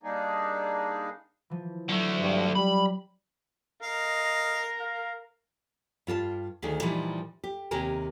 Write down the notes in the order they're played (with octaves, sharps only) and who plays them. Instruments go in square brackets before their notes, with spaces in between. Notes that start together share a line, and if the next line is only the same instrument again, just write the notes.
[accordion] G3 A#3 D4 D#4 G#4
[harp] E3 F3
[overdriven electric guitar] D3 A3 [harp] F#3
[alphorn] G2
[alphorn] G3 [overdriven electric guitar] B5
[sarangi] A#4 [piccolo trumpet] D#5 [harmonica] F5
[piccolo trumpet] F5
[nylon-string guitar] G2 F4 B4 A5
D2 D#3 G#4
A#2 E3 F3 G3 D#4
G4
D#2 C3 G4 A#4 G#5